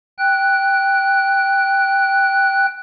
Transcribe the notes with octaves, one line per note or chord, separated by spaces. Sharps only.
G5 F#6